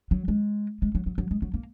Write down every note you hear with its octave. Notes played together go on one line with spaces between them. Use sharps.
F#3
G#3
G#3
F#3
F#3
F#3
G#3
F#3
A#3